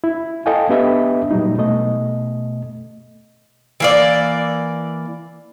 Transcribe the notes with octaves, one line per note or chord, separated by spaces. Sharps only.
E4
A4 D#5 F5 G5 G#5
B3 D4 G4 B4 D#5 E5
A#2 F#3 G3 D#4
B2 A3 D#5
E3 A#3 D5